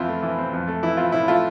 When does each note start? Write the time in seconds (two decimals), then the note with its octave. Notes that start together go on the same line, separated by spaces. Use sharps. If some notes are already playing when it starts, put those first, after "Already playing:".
Already playing: F2 E3 C4 E4 F4
0.08 A3
0.23 E3
0.38 C4
0.53 F2
0.68 A3
0.83 E3 E4
0.97 C4 F4
1.12 A2 E4
1.28 A3 F4